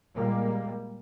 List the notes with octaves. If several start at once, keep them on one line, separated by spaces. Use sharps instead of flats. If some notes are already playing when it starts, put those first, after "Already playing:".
A#2 G3 G#3 A#3